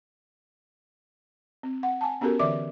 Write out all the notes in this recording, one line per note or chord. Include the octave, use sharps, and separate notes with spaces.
C4
F#5
G#5 A5
B3 C#4 F#4 G4 A4 A#4
D3 E3 D5 E5 D6